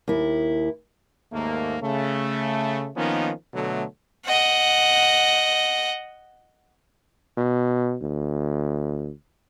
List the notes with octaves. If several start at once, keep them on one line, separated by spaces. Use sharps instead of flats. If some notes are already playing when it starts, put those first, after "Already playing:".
D#2 E4
D#2 G#2 A3 A#3
C#3 A3
D#3 F3 A#3 B3 C#4 D#4
B2 D3 F#3 A3
D#5 F#5
B2
D2